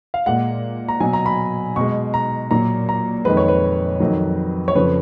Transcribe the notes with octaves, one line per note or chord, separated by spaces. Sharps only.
F5
A#2 G#3 F#5
A#5
B2 F#3 G#5
A#5
B5
B2 G#3 C#6
A#5
A#2 F#3 A#5
A#5
F2 D#3 G#3 B4
C#5
B4
F2 D#3 F#3
C#5
F2 C#3 F3 B4